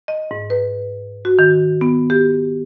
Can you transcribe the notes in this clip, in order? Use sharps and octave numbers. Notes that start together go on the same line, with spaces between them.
D#5
G#2
B4
F#4
D#3
B3
G4